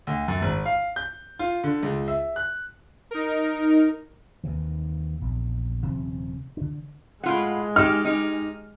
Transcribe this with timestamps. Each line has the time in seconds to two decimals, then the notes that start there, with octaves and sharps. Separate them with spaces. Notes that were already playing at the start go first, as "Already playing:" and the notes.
0.07 D2
0.28 F#2
0.42 G#1
0.66 F5
0.96 G6
1.39 F4
1.64 D3
1.83 C#2
2.08 E5
2.36 F#6
3.11 D#4 A#4
4.44 D#2 C3 D#3 E3
5.21 A#1 E2
5.85 D#1 C3 F3 C#4
6.57 D3 D4
7.24 A2 G#3 F4 F#5
7.76 D#4 G4 F6
8.05 D#4 G4